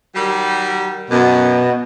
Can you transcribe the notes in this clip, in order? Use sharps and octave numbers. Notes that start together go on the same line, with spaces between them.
D#3 F#3 G3
F#2 B2